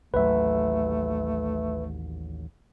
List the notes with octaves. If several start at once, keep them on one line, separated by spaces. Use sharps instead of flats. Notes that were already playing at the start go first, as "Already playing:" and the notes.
A1 D#2 F#3 A3 B4 E5